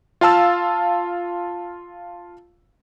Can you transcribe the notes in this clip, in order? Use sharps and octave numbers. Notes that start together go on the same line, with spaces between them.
F4 F5 A5 E6